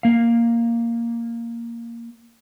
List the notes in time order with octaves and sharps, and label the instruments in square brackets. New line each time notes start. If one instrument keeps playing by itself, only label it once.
[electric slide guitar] A#3 F5